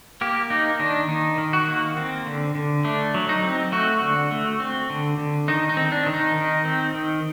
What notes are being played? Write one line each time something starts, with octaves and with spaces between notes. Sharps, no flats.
A#3 G4
A#3 D#4
D#3 D4
D#3 D#4
D#3
F#4
A#3
C4
D3
D3
A3 D4
F#3
D#4
C4
A3 F#4
D3
A3
C4
D3
D3
D#3 D#4
D#4
C4
D4
D#3
D#4
D#3
C4
D#3